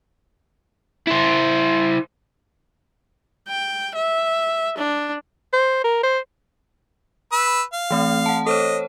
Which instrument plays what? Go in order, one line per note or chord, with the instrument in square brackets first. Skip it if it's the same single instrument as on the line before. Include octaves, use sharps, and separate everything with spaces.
[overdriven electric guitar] E4 C5
[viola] G5
E5
D4
[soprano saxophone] C5
A#4
C5
[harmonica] B4 E6
F5
[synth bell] E3 A3 C4
F#5 A5
[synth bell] A4 C5 C#5 [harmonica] D#5